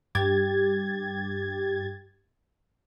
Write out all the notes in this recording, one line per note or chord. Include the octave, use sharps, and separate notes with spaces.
G2 G4 G#6 A6